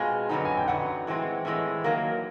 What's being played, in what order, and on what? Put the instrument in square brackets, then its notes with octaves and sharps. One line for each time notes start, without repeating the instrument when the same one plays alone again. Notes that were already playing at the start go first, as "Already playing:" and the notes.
Already playing: [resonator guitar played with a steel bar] B2 G#3 C4 F4 [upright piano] G#5
[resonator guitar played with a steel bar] F#2 D3 F#3 B3 D#4
[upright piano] G#5
G5
[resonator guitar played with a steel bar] F#2 D3 F#3 B3 D#4 [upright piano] F#5
[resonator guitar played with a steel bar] A2 E3 G#3 C4
A2 E3 G#3 C4
D#3 F#3 A#3